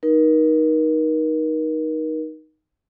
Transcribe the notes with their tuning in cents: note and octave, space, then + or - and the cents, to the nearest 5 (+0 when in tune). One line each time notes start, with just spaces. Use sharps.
D#4 +0 A#4 +35